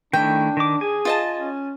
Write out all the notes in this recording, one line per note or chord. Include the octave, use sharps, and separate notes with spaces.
D#3 A3 D4 E4 G5
D#3 D6
G#4 G#5
F4 D#5 A5
C#4